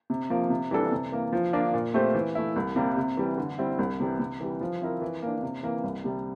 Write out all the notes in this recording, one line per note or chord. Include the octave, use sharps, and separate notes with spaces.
C3
F3 A#3
C3
E3 G3 D4 A4
C3
E3 A#3
F3
A#3 D4 F4
A#2
A3 C4 G4 C5
E3
A3 E4
C2
C3 G3 A#3
C3
E3 G3
D3
G3 C4 E4
C2
C3 E3 G3
C3
E3 G3
F3
C4 E4 A#4
E3
A#3 D4
C3
E3 A#3
C2
C3 G3